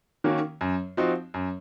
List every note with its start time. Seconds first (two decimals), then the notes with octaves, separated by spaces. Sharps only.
0.24 D#3 A#3 C#4 F#4
0.61 F#2
0.97 F3 C4 D#4 F#4
1.34 F#2